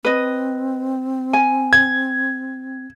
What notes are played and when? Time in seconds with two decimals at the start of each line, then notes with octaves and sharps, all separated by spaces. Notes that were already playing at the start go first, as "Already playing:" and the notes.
0.05 C4 B4 D#5
1.33 G#5
1.73 G#6